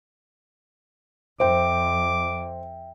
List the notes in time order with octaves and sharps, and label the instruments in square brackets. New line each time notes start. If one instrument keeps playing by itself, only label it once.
[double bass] F2 [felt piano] C5 [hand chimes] E5 G5 [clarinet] D6